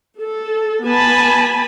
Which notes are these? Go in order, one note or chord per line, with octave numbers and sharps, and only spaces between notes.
A4
B3 G#5 A5 B5